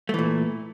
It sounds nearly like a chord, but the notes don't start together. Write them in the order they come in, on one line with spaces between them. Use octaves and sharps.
A3 E3 A#2